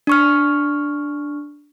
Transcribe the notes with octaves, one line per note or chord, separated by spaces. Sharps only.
D4 C#6 F6